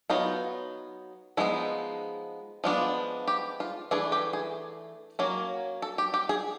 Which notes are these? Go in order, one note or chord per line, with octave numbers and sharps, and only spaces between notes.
F#3 B3 D#4 F4
F3 G#3 B3 D#4 E4
F3 G#3 B3 D4 F4
G4
F4
E3 A3 D4 G#4
G4
G#4
F#3 A#3 C#4
A4
G4
G4
G#4